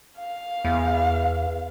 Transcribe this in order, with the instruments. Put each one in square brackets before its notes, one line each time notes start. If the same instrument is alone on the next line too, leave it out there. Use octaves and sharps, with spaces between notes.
[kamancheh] F5
[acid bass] E2